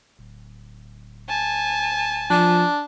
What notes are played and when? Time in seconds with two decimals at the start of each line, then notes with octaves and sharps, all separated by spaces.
0.19 D1
1.29 G#5 A5
2.30 F3 D4